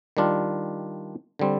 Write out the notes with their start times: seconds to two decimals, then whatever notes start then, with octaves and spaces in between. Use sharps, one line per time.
0.17 D#3 G3 D4 F4
1.39 D3 G3 C4